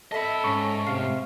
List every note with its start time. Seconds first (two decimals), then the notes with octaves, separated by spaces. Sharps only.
0.12 A4 D#5 E5 B5
0.44 G#2 C#4 C#6
0.86 C3 F5